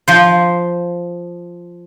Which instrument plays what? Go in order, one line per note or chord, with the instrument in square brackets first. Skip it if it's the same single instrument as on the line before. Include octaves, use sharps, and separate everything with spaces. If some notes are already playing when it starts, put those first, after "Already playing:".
[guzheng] F3 C5